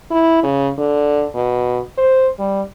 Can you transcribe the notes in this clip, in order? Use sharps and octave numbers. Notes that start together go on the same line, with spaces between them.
E4
C#3
D3
B2
C5
G3